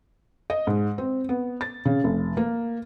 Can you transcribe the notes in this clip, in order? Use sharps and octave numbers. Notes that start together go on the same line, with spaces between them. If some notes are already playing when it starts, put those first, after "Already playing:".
D#5
G#2
C4
B3
A6
C#3
F1
A#3